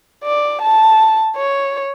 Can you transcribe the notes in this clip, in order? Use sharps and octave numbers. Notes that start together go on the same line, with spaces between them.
D5
A5
C#5